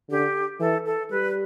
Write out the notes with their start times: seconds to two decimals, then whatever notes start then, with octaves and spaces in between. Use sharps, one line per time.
0.10 D3 G4
0.60 E3 A4
0.86 A4
1.10 G3 B4